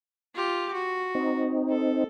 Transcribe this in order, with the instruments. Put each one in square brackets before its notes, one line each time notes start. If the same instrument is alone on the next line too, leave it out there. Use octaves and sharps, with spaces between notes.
[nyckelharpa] F4 G4
F#4
[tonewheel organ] C4 D#4
[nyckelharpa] A4